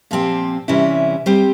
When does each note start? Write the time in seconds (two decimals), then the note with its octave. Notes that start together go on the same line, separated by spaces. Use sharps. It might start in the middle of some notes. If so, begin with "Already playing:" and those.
0.11 A#2 F3 C4 G4
0.68 C3 E3 G3 C#4 E4
1.26 G3 C4 G4 C5